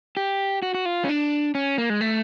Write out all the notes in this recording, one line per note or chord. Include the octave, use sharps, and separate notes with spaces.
G4
F#4
F#4
F4
C#4
D4
C#4
A#3
G#3
A3